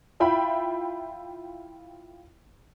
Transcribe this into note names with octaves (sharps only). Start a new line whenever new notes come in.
E4 F4 E5 G5 B5